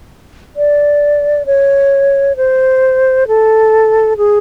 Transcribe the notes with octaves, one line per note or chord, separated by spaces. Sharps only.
D5
C#5
C5
A4
G#4